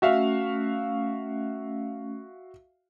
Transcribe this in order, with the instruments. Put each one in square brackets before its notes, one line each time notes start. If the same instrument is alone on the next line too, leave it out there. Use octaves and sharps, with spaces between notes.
[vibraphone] A3 C#4 [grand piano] F#4 E5 F5